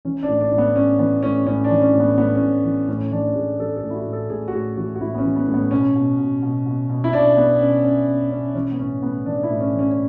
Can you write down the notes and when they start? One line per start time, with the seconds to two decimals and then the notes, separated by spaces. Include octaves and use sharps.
0.05 E3 C#4
0.23 D4
0.28 A2
0.41 D4
0.52 A2
0.58 B3
0.76 A2 C#4
0.99 E3 B3
1.23 A2 C#4
1.46 A2 C#4
1.64 D4
1.70 E3
1.82 C#4
1.94 A2
2.00 B3
2.17 A2 B3
2.35 C#4
2.41 A2
2.64 E3
2.88 A2 C#4
3.12 E3 D4
3.35 A2 G#4
3.59 E3 A4
3.76 A4
3.82 A2
3.90 E4
3.95 F#4
4.06 A2
4.13 A4
4.30 A2 G#4
4.48 F#4
4.53 A2 G#4
4.77 E3 F#4
4.95 F#4
5.01 A2 E4
5.15 B3
5.18 C#4
5.24 E3
5.36 B3
5.48 A2
5.54 B3
5.71 B2 C#4
5.95 B2
6.19 B2
6.42 B2
6.66 B2
6.89 B2
7.04 E4
7.13 B2 D4
7.37 B2 B3
7.61 B2 C#4
7.84 B2 C#4
8.08 B2 C#4
8.31 B2 C#4
8.54 E3 C#4
8.72 B3
8.79 A2 C#4
9.02 A2 B3
9.26 E3 D4
9.43 E4
9.50 A2
9.61 C#4
9.73 E3
9.79 C#4
9.92 C#4